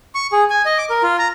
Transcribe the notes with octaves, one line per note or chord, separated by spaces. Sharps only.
C#6
G#4
G#5
D#5
D6
A#4
F4
A#5